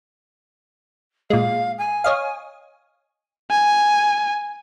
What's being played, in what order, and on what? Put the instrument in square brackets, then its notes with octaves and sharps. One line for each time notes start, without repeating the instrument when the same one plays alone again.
[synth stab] A#2 G#3 [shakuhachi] F5
[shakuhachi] G#5
[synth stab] C#5 D#5 F5
[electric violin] G#5